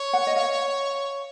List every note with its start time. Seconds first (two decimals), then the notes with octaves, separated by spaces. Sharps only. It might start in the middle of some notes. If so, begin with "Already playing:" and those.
Already playing: C#5
0.13 F#5
0.27 D#5
0.36 F5